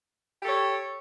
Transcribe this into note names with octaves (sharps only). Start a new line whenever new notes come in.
G4 A4 C#5